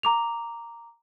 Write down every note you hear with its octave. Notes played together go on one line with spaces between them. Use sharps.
A#5 D6 F7